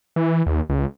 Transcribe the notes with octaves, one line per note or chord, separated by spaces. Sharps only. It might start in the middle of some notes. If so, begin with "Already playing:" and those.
E3
D#2
C#2